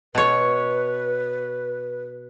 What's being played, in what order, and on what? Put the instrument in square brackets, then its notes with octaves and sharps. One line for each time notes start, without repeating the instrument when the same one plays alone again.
[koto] B2 C#5 [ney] B4